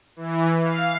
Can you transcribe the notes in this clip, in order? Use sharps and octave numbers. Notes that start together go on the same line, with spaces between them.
E3
F5